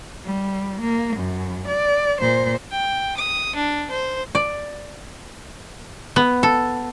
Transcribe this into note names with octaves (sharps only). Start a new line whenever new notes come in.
G3
A#3
F#2
D5
A#2 C5
G5
D#6
D4
C5
D5
B3
A4